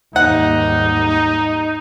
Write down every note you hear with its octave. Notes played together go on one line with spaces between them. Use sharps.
D#2 G#2 G3 D#4 F#5